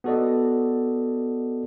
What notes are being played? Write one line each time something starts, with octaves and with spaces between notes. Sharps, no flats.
B3 F#4 A4 D5 D#5